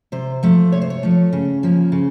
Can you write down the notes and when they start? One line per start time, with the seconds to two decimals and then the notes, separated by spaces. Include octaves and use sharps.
0.12 C3 C5
0.43 F3 A3
0.72 C3 C#5
0.82 C5
0.90 C#5
1.03 F3 A3
1.33 C#3
1.63 F3 A#3 C#4
1.92 C#3